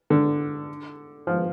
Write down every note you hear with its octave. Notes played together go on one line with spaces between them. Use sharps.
D3
F3